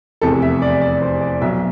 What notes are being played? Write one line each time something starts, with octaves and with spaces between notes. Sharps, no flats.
F1 E2 C3 A4
E5
D5
D5
C5
D5
B1 B2 E5